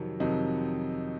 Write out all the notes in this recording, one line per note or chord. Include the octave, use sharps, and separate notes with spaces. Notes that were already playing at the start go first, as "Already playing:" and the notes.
Already playing: F2 C3 D#3 F#3
F2 C3 D#3 F#3 D#4